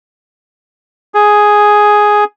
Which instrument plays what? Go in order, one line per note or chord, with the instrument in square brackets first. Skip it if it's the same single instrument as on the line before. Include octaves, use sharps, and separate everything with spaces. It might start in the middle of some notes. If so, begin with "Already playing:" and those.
[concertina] G#4